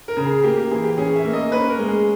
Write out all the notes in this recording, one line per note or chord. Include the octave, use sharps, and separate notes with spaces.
A#4
C#3
G#4
A#3 G4
G4
E3 G#4
G4
C#4 G#4
E5
A#3
D#5
C#4 B4
A#4
G#3
G#4